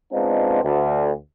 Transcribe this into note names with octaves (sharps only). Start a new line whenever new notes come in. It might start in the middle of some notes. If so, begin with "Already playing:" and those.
G#3 B3 C4 D4 D#4 F4
D2